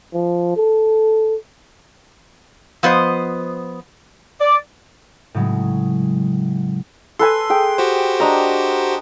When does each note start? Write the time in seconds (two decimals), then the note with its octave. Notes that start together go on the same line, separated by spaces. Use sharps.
0.14 F3
0.56 A4
2.83 F3 B3 C5 D#5
4.40 D5
5.34 A2 C#3 F#3 G#3
7.19 A4 B4 G#5 C6
7.50 G#4 G5
7.78 F#4 G4 C5
8.20 D4 D#5 A#5